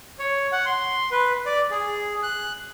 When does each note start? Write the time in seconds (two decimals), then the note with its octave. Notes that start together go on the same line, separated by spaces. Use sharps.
0.19 C#5
0.52 F#5
0.66 C6
1.11 B4
1.46 D5
1.71 G#4
2.23 F#6